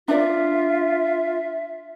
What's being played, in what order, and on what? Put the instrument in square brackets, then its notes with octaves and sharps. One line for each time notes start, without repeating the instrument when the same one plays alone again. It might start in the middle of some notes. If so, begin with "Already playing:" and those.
[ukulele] D4 D5 [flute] F4 [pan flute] E5